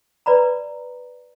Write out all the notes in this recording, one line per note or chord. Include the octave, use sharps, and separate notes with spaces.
B4 D5 A#5 B5